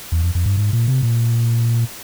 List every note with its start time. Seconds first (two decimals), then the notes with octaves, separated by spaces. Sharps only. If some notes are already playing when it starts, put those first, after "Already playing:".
0.12 E2
0.23 F2
0.35 F2
0.46 G2
0.57 G#2
0.73 A#2
0.88 C3
1.03 A#2